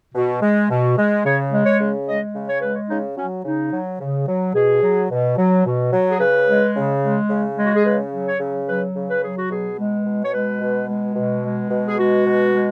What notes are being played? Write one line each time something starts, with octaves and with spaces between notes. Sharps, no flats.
B2
G#3
B2
G#3
C#3 C#5
G#3
C#5
C#3
G#3 D#5
C#3
C#5
G#3 B4
C#5
C#3 D#4
F#3 C#4
C#3 D#4
F#3
C#3
F#3
B2 G#4
F#3
B2
F#3
B2
F#3
G#4
C#3 B4
G#3
C#3
G#3
C#3
G#3
F#4
G#4
C#3 B4
F#3
C#5
C#3
F#3 B4
C#3
B4
F#3 G#4
F#4
B2 G#4
G#3
B2
C#5
G#3 B4
B2
G#3
B2
G#3
B2
G#4
G#3 F#4
B2
G#3